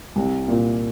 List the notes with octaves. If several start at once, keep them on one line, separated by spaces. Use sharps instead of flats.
C2
A#2 A#3